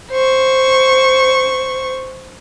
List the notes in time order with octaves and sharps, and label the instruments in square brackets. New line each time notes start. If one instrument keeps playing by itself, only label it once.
[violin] C5 C#6